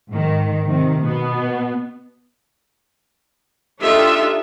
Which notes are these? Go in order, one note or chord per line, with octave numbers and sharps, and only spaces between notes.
G#2 D#3
C3 D#3
B2 B3
D4 D#4 F4 G4 A4 E5